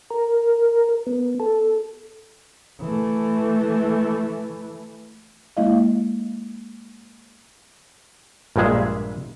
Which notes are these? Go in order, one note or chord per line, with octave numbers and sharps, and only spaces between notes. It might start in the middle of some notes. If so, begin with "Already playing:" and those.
A#4
B3
A4
E3 A3
G#3 A#3 E4 D#5 F5
A#1 G2 A#2 G#3 G#4 E5